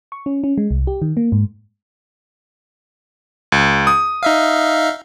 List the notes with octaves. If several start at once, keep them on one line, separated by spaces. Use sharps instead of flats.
C#6
C#4
C#4
G#3
C2
G4
D#3
A#3
G#2
C#2
D#6
D#4 E5 F5